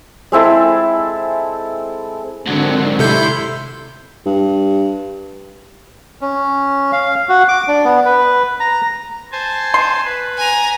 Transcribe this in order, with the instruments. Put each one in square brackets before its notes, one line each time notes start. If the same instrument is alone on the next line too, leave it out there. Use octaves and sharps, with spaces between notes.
[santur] G#3 C4 E4 A4
[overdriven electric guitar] G#2 F#3 [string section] D3 D#3 C4
[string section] A2 E4 C6 [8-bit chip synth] C3 A4 G6
[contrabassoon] G2
[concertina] C#4
F5
F#4
D6
D4
B3
B4
A#5
[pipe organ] C5 G#5 A5
[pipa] C6
[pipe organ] B4
[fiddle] G#5 A#5